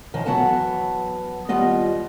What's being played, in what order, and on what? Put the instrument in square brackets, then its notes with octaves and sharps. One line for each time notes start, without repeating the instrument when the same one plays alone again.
[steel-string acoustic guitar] F#2 D#3 F3
E3 F#3 B3 F#5 A5
D#2 G3 B3 F4 D#5